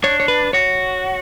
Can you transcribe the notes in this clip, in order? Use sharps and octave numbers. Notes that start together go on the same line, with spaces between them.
D4 C#5
C#5
B4
F#4 C#5